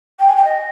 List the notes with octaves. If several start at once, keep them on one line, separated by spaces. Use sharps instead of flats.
G5
G#5
G5
D#5